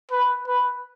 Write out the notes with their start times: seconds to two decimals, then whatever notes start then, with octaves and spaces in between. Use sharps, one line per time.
0.11 B4
0.47 B4